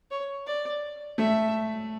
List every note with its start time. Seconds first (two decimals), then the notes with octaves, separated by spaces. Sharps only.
0.11 C#5
0.46 D5
1.18 A3 E5